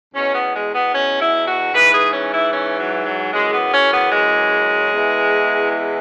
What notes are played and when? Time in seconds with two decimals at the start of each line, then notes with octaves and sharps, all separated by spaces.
0.15 E2 B2 C#4
0.35 B3
0.55 G#3
0.75 B3
0.94 C#4
1.21 E4
1.47 F#4
1.73 G#2 E3 B4
1.93 G#4
2.13 C#4
2.33 E4
2.53 C#4
2.80 F#3
3.06 F#3
3.32 F#2 C#3 E3 G#3
3.53 B3
3.73 C#4
3.92 B3
4.12 G#3
4.91 E2 E3
5.70 G#3